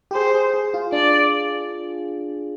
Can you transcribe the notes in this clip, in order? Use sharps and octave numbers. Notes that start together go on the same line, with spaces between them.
G4
G#4 C5
G#4
G#4
F4
D4 D5